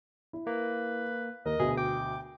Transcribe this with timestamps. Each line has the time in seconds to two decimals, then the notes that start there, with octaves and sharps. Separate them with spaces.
0.33 E4
0.47 A#3 B4
1.46 D#2 A#4 D#5
1.60 D2 B2 G#4
1.77 G5 D6